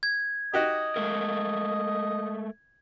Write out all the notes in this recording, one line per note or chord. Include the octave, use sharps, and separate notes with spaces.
G#6
D#4 F#4 G4 D#5
G#3 A3 A#4